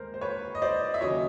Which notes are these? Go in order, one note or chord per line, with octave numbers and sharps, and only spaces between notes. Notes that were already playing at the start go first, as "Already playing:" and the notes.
Already playing: D#2 G#3 A#4 C5
C5
B4 C#5
D#5
C5 D5
E5
D#2 C#3 F#3 C#5 D#5